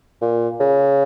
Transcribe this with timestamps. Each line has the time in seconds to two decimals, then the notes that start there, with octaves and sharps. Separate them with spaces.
0.22 A#2
0.60 C#3